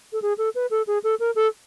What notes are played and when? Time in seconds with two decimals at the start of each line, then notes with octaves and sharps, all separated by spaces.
0.12 A4
0.22 G#4
0.38 A4
0.55 B4
0.71 A4
0.87 G#4
1.03 A4
1.20 A#4
1.35 A4